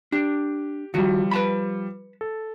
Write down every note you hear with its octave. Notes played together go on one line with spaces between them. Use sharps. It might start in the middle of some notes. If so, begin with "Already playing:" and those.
D4 G4
D#3 F3 G3 F#4
B4 A5 B5
A4